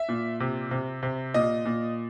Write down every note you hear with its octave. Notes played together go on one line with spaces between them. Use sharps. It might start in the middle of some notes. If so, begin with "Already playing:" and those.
Already playing: E5
A#2
C3
C3
C3
A#2 D#5
A#2